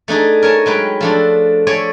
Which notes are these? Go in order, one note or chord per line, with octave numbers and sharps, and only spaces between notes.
A3 D4 D#4 G#4
A#4 C#5 G#5 A5
F#3 G#3 B4 G5
F3 A3 D4
A3 C#5 D5 G#5